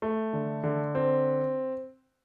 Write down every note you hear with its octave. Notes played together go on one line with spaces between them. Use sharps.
A3
D3
D3
C4